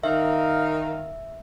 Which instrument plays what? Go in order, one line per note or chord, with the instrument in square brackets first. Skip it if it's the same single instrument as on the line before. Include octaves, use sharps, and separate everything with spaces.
[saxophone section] D#3 F5 [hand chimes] E5